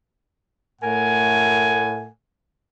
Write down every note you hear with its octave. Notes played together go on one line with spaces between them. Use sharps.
A2 A3 A#4 F#5 G#5